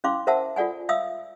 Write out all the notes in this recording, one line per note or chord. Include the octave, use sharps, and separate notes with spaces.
C#4 E4 F5 C6 D6
A#4 C5 E5 F#5 A5 E6
F4 A4 D5 F#5 G#5
E5 F5 D#6 E6